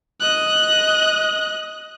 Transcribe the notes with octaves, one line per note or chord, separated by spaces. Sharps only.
D#5 F#6